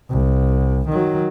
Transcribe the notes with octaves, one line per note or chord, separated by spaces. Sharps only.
C2
D#3 F#3